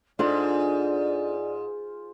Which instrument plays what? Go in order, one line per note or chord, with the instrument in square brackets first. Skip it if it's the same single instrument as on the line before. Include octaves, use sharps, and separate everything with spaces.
[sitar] G#2 [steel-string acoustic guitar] D4 A4 F#5 [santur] F4 C5 [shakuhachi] D5